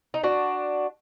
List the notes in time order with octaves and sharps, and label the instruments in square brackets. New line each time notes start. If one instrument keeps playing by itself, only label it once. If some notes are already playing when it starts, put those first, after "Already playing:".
[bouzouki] D#4
D4 F#4